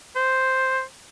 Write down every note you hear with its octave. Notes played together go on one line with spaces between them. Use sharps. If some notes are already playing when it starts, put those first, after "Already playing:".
C5